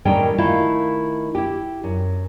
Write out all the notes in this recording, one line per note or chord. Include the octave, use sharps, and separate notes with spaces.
A2 D#3 G3 C#4 A#4 G5
D#3 A3 E4 F4 F5
E4 G4
F#2